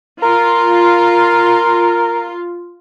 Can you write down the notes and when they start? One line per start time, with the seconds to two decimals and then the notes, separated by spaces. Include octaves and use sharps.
0.22 F4 A#4